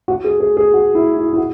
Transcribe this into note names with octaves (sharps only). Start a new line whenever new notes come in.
F#4
G#4
G#4
G#4
F#4
E4
E4
E4
F#4